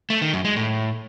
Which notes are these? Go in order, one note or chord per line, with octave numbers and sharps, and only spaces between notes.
A3
D#3
F#2
G#3
A2